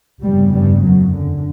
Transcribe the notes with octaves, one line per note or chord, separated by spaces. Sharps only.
F1 E2 G2 C#3 G3
G2 G3
F#2 F#3
D3